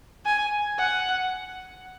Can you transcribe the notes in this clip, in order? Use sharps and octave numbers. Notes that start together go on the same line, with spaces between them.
G#5
F#5